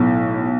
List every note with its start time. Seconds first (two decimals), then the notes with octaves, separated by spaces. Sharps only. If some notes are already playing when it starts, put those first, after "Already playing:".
Already playing: B1 A2